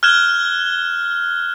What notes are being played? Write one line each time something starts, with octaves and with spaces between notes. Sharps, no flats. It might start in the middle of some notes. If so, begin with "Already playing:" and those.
F6 F#6 G#6 E7 G7